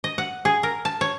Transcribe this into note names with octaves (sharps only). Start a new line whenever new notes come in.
D#5
F#5
G#4
A#4
A5
C#5